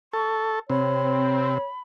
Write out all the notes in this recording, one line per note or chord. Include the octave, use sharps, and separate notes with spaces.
A4 C#6
C3 C4 C#5 B5